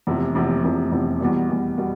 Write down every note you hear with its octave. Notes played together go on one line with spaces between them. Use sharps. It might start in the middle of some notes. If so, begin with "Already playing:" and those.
F1 E2 C3 F3
F1 E2 C3 F3
F1 E2 C3 F3
F1 E2 C3 F3
E2 B2 G3
E2 B2 G3
B2 G3